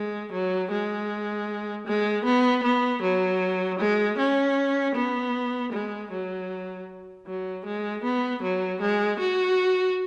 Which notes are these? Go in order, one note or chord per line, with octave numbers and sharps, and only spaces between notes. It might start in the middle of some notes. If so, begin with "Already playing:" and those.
Already playing: G#3
F#3
G#3
G#3
B3
B3
F#3
G#3
C#4
B3
G#3
F#3
F#3
G#3
B3
F#3
G#3
F#4